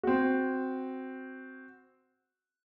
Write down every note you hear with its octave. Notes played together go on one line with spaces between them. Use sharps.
C4 F#4